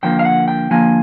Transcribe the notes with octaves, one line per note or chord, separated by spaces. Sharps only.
D3 F3 A#3 G5
F5
F#5
G5
D3 F3 A#3 G#5